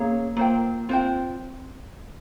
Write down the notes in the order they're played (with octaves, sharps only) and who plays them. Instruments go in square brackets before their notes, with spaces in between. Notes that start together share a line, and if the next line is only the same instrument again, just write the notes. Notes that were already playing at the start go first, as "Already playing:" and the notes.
Already playing: [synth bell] A#3 [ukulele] C#4 G#4 C#5 F5
[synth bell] A#3 [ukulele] F4 C5 G5
[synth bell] C4 [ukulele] F4 C5 G5